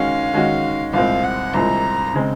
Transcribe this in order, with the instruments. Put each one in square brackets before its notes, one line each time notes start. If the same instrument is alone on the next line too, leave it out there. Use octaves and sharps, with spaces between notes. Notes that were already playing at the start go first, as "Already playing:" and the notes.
Already playing: [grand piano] D#3 G#3 C#4 F#4 [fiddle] F5
[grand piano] D#3 G#3 C#4 F#4
[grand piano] C2 A#2 G#3 C4 [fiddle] F5
[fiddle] F#5
[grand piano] C2 A#2 G#3 C4 [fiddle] A#5
[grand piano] C#3 G#3 C4